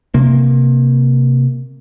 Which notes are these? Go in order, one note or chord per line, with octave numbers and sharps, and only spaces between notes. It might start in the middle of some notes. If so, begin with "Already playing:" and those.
C3 A#3